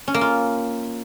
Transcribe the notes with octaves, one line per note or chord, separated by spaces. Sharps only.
C#4
A#3
F4